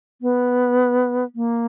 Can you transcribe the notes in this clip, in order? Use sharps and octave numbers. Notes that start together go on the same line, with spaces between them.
B3
A#3